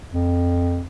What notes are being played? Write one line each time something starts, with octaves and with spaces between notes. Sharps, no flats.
F2